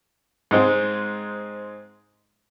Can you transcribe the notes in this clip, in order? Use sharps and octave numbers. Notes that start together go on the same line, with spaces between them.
G#2 G#3 C4